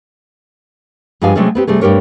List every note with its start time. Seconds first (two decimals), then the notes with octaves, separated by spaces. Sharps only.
1.21 G2 F3 G#3 G4 F5 G#5
1.35 C3 F#3 G#3 A3 C#4 G#4
1.55 B3 C4 G4
1.67 C3 G3 A3 G#4
1.81 G2 D#3 C4 G4 A#4 C#5